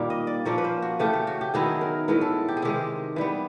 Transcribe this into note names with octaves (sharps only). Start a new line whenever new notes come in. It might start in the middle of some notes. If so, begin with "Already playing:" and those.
Already playing: A#2 D#3 G3 A#3 C4
D#5
D5
A#2 F3 A#3 C#4 C#5
B4
C5
F#4
C#3 E3 A3 C#4 G4
G4
F#4
G4
D#3 F#3 B3 E4 G#4
A#4
A2 E3 G#3 B3 A#4
A4
G4
G#4
C3 D#3 G#3 G4
E3 G3 B3